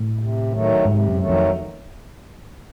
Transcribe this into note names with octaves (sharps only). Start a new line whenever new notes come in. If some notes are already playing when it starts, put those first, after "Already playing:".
Already playing: A2
C3
D#3 F#3 A3
G#2 C3
F#2
D#3 F#3 A3
F2